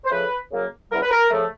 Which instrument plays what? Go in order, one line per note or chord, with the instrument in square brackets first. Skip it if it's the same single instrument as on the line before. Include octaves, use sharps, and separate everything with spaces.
[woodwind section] C5
F2 C#3 F3 A3 B4
F#2 C#3 F#3 A#3
E2 C#3 E3 G3 A#4
B4
A#4
C#3 F3 A3